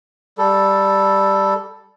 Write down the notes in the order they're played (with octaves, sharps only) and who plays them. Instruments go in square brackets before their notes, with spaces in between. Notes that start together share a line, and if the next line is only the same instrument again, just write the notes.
[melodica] G3 A4